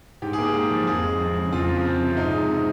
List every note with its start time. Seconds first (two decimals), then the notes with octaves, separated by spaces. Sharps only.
0.22 G#2 G4
0.33 A#3 G#4
0.44 G4
0.54 G#2
0.70 F3
0.87 F2 G#4
1.03 G#3
1.20 F2
1.36 C#3
1.52 F2 F4
1.69 F3
1.85 C4
2.02 C3
2.17 G#2 D#4
2.33 G#3
2.50 C4